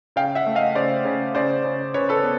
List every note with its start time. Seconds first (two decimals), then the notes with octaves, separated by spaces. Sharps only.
0.16 C#3 F5 G5
0.35 E5 F#5
0.46 A3
0.55 D#5 F5
0.75 C#3 C5 D5
1.05 C#3
1.35 C#3 C5 D5
1.64 C#3
1.94 C#3 B4 C#5
2.09 A4 B4
2.23 B3